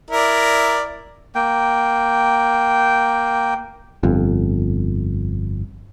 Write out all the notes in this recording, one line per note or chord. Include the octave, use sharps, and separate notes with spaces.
E4 A#4 D5
A#3 G5
G1 F2